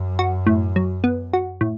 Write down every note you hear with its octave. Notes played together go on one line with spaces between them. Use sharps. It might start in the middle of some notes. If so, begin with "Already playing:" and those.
Already playing: F#2
F#4
A2
F#3
B3
F#4
A2